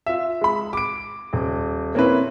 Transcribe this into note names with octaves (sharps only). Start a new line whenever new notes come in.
F4 E5
G#3 B5
D6 D7
D#1
A#3 C4 C#4 E4 B4